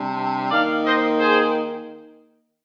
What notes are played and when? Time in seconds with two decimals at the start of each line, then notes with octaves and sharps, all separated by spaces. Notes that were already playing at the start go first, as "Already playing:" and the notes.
Already playing: C3 G3 D4
0.51 D#3 A#3 D#4 D5 F5
0.84 C5 D#5
1.17 G#4 C5